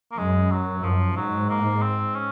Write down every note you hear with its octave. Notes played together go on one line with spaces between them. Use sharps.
A#3
F#2 G#3
F#3
F#2 F3
G#2 F#3
A#3
C4
C#4